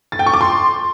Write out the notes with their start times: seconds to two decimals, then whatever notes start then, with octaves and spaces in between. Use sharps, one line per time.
0.12 A6
0.19 G5
0.26 C#6
0.34 D6
0.41 C6